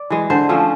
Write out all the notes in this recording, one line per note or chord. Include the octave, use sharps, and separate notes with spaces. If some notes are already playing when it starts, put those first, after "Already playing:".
Already playing: D5
E3 G#3
D3 C5
F3 A3 C#4